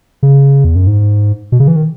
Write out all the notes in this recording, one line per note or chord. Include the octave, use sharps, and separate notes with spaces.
C#3
E2
F#2
G#2
B2
C#3
E3
D#3